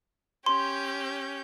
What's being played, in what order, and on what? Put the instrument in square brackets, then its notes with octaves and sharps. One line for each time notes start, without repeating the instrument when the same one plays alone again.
[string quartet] C#4 G4 G6 [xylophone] C6